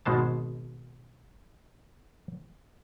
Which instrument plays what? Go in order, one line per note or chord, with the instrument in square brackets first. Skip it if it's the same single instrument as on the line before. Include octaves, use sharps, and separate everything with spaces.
[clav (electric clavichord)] G#1 B2 G#3 C5 A5